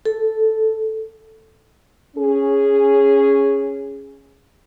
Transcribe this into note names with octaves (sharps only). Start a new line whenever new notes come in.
A4
C#4 G#4